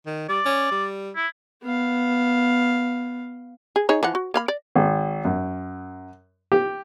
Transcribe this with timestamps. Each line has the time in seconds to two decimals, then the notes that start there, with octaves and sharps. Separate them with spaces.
0.06 D#3
0.29 G3 D5
0.45 C#4
0.72 G3
1.16 E4
1.63 B3 F5
3.76 G#4
3.89 D#4 G#4 C#5
4.03 E3 F3 F#5
4.15 F#4
4.34 A#3 F5 B5
4.48 D5
4.76 G#1
5.25 F#2
6.52 G4